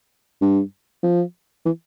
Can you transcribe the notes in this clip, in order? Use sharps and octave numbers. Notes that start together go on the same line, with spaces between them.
G2
F3
E3